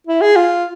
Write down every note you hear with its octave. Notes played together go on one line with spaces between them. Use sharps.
E4
G#4
F4